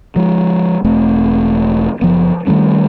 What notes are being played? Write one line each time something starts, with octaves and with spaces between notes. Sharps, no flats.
F3 G#3
E1 A3 C4
F#1 F3 B3
D#3 G3 A3 C#4